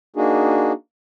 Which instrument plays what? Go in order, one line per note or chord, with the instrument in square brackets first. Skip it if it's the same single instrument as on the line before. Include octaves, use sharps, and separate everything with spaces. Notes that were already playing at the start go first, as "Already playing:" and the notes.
[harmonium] A#3 D4 D#4 F#4 G#4